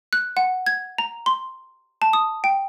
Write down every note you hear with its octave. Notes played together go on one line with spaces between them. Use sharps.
F#6
F#5
G#6
A#5
C6
A5
D#6
G5